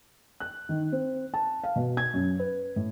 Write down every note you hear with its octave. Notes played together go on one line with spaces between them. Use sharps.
F#6
D#3
C4
A5
F5
B2
G#6
F#2
B4
A2